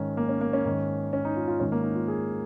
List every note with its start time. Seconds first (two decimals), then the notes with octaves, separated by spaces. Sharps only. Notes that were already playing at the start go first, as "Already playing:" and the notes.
Already playing: G#2 D#3 C#4
0.17 A#3
0.29 C#4
0.41 A#3
0.53 C#4
0.65 G#2 D#3
1.13 C#4
1.25 D#4
1.36 F4
1.48 F4
1.60 G#2 D#3 C#4
1.72 A#3
1.83 D#4
1.95 F4
2.08 G#4